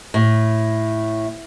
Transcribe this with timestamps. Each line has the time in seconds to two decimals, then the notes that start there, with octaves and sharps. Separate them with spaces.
0.14 A2